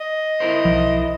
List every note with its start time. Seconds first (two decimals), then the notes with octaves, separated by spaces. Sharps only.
0.01 D#5
0.40 E4 A#4 C5
0.65 B1 F3